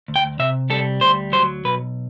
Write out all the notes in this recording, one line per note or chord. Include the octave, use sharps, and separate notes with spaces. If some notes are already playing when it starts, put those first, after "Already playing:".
D2
G5
C3 E5
G3 A4
D2 C5
F#3 C5
B1 B4